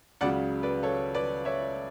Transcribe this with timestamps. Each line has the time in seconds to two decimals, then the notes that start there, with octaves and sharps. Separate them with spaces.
0.21 C#2 C#3 F#3 D5 F#5
0.63 B4 D5
0.83 A4 C#5
1.15 B4 D5
1.45 C#5 E5